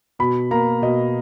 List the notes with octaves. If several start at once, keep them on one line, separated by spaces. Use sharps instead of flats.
B2 B5
A#3 A#5
B2 D#5